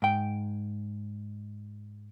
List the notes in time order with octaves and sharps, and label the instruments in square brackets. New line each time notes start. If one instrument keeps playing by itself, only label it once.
[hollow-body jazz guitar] G#2 G5